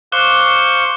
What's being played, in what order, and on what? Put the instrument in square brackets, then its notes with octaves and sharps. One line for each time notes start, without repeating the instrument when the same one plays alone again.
[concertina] C5 F5 C#6 [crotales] D6 F#6 G7